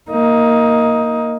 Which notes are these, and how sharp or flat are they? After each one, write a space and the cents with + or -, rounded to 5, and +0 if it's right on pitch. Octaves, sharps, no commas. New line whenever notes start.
A#3 +0 D#4 +15